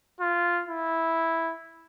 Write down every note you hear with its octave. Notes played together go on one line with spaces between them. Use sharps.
F4
E4